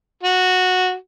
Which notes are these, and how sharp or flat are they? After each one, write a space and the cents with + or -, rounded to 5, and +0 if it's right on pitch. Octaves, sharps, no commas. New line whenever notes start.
F#4 -10